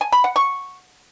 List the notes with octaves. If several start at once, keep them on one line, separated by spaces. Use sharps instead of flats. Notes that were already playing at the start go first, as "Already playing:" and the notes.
G#5
B5
F#5
C#6